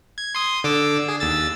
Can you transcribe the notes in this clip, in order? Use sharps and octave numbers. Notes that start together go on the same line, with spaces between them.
G#6
C6 D#6
D3 D6 E6
G#4
D#2 E6 A6